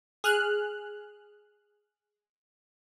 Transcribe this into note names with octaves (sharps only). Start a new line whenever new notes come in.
G#4 F6 F#6